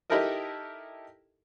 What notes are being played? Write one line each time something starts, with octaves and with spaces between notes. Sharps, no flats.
D#4 E4 G4 A4 A#4 D#5